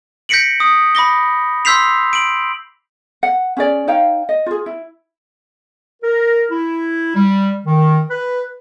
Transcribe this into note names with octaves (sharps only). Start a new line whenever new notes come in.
G6 A#6 B6 C#7 D7 F#7
D#6
B5 D6 A#6 G7
C6 E6 G6 B6 C7 F7
D7 F#7
F#5
C#4 G#4 D5
D#4 C#5 F5 G5
D#5
F4 G#4
E4
A#4
E4
G3
D#3
B4